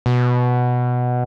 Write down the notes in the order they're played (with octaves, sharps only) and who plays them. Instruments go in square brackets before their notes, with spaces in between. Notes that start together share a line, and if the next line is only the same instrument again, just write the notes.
[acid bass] B2